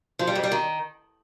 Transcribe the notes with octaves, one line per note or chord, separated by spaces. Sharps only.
F3
G3
F2
G3
D#3